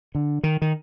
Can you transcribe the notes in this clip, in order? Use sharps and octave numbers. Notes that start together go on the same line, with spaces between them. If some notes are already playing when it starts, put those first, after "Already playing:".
D3
D#3
D#3